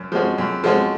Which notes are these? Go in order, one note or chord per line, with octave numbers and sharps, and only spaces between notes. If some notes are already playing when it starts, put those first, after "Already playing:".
Already playing: F#2
F3 G#3 C#4 F#4
F#2
F3 G#3 C#4 F#4